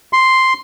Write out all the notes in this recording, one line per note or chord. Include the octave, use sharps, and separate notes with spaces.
C6